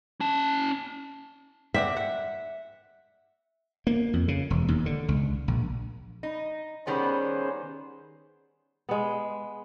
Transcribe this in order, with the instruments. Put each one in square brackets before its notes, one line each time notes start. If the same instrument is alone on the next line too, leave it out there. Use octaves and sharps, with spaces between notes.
[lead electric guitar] C#4 A5
[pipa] C4 D5 F#5 [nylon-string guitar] E5
[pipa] F#5
[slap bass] A#3
F2
C#3
E1
D#2
D3
C#2
A#1
[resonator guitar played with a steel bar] D#4
[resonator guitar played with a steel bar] D#3 G3 B3 [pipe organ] C#4 G#4 C5
[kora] G#3 B3